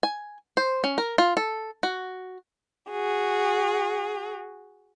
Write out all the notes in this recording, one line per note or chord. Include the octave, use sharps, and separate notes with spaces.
G#5
C5
C#4
A#4
F4
A4
F#4
F#4 G#4